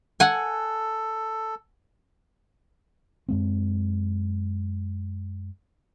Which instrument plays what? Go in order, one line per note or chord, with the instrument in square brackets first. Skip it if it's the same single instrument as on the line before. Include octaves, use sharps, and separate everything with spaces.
[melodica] A4 [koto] F#5 G#5
[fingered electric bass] F#2 G#3 C4